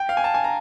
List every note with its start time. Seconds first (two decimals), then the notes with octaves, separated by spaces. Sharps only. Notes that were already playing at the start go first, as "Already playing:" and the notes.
Already playing: G5
0.09 F5
0.17 G#5
0.24 A5
0.34 G#5
0.44 A#5